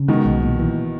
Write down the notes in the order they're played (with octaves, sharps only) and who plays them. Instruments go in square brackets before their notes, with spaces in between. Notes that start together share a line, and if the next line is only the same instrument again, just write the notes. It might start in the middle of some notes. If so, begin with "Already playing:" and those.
Already playing: [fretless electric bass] C#3
[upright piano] B2 D#3 [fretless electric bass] G#3
[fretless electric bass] B1
A#2
E3